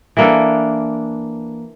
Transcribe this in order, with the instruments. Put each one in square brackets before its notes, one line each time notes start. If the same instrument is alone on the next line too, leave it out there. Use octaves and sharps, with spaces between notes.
[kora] E3 A#3 D4 A4